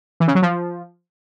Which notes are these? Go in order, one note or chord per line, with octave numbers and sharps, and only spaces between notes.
E3
C#3
F#3
F3